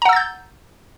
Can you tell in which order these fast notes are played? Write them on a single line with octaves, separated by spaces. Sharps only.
A#5 F#5 E6 A6 G6